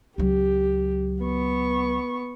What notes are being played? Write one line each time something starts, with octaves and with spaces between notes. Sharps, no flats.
C#2 F#3 G4
B3 C#6